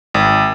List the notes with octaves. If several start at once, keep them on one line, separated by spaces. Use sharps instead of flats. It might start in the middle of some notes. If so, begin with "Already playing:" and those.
G#1